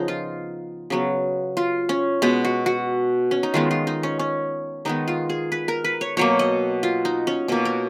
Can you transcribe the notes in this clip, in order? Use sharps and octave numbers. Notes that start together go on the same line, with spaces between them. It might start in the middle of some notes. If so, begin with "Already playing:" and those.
Already playing: C#3 F3 B3 D#4 G#4
F4
C#3 F#3 B3
F4
C#4
B2 G#3 B3
F#4
F#4
C#4
D#4
D#3 G#3 B3 F4
F4
D#4
C#4
C#4
D#3 G#3 B3 D#4
F4
G#4
B4
A#4
B4
C#5
B2 F#3 A#3 C#5
D#5
F4
D#4
C#4
B2 A#3 C#4
A#4